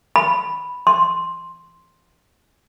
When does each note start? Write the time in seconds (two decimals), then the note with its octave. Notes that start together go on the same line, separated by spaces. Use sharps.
0.16 B5
0.87 C6